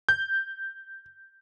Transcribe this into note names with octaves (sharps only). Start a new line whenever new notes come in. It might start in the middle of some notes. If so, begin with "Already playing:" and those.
G6